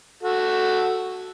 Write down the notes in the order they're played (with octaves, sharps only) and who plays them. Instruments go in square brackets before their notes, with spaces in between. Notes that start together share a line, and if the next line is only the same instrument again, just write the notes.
[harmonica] F#4 A4